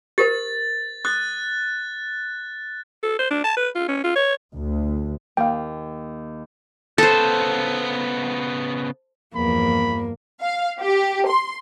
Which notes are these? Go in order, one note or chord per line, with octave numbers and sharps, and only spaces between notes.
G4 A#4 C5 A6
D#6 F#6 A6
A4
C5
D4
A5
B4
F4
C#4
F4
C#5
D2
D#2 F5 G5
C#3 B3 A4 C5
E2 G2 F3 A#3 B5
F5
G4
C6